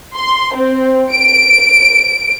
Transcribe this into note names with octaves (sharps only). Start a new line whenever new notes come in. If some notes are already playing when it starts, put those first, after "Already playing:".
C6
C4
D7